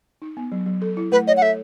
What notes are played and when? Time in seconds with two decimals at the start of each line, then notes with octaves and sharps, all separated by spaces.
0.22 D#4
0.37 B3
0.52 F#3
0.66 F#3
0.82 A4
0.97 E4
1.12 A3 B4
1.27 C#5 D#5
1.37 F#5
1.42 A4 E5